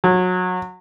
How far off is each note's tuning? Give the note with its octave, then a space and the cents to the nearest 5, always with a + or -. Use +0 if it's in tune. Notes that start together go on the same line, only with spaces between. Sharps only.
F#3 -20